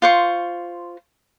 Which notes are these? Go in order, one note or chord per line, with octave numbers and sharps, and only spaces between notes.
F4 C5 C#6